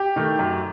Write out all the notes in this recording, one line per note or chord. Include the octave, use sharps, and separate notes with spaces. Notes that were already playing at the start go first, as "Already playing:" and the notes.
Already playing: G4
D#3 A3
F#2